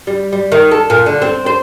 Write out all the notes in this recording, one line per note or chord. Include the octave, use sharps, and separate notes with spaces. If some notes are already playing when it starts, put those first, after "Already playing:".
G3
G3
D#3
A4
A#2
D3
C4
C5